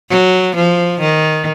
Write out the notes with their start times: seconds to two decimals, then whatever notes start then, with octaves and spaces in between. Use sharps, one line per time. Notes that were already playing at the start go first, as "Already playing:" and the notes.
0.10 F#3
0.55 F3
1.00 D#3